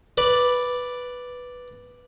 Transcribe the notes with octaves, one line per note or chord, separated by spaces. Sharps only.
B4 D5